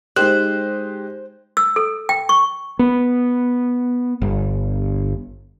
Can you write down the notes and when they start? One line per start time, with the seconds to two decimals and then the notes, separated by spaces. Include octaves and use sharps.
0.16 G#3 D#4 G4 C5 F#6
1.57 E6
1.76 A4
2.09 G5
2.29 C#6
2.79 B3
4.22 G1